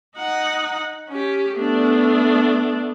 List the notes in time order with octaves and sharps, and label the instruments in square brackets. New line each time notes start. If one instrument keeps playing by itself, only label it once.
[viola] D#4 F#5
C#4 G4
[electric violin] A3 B3 [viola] D4